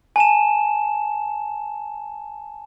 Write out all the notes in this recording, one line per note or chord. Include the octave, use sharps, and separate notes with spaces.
G#5 A5 E7